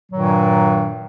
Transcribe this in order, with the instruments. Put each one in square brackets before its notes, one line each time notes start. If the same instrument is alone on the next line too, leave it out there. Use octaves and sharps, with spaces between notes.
[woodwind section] G2 A#2 D#3 F#3